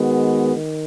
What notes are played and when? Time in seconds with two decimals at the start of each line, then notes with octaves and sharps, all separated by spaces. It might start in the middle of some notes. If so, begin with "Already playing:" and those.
Already playing: D#3 G#3 B3 F#4
0.56 D#3